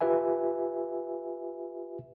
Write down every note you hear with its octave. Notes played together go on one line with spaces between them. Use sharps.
F4 G4 B4 E5 G#5